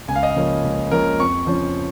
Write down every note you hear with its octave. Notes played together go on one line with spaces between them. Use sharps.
C#2 G#5
F5
D#5
F5
C#3 F3 A#3 C#4
C#2
C#3 F3 A#3 C#4 A#4
F2 C#6
C#3 F3 C#4